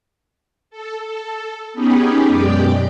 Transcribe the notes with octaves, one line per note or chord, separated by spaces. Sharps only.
A4
A4
B3 C#4 D#4 G4 G#4 B4
F#2 B2 G#3 G4 D5 G5